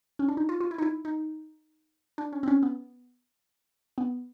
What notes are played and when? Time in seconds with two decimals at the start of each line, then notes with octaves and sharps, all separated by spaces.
0.19 C#4
0.28 D4
0.37 D#4
0.49 F4
0.60 F4
0.71 E4
0.78 D#4
0.82 E4
1.05 D#4
2.18 D4
2.33 C#4
2.43 C4
2.48 C#4
2.63 B3
3.98 B3